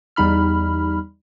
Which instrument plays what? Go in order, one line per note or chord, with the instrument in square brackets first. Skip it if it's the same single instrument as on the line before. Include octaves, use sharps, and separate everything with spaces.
[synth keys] E2 G3 D#4 B5 F6